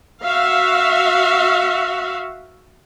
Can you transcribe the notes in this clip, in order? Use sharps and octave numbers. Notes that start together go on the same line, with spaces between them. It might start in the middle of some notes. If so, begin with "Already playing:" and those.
F#4 E5 F5